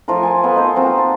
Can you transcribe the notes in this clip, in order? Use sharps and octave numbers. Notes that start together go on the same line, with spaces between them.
F3 A3 F4 A#4
G#5 A5
B3 F4 A4
D#4 C5
A#3 C4 F4 F#4
A5